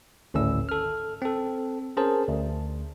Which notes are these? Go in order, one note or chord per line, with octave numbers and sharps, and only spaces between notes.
G#1 D2 A2 C#4 E6
A4 F6
C4 A4
C#4 G#4 A#4 C5 A5
D2